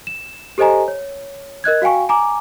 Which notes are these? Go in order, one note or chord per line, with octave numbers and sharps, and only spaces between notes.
E7
G4 A4 C5 D#5 G#5 A#5
C#5
A#4 D#5 F#6 G#6
F#4 F5 G5 G#5 C#6
G#5 A#5 D6